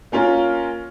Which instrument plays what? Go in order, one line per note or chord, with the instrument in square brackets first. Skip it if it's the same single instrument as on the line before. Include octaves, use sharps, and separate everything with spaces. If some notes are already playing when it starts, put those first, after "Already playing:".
[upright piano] A#3 C#4 F4 A#4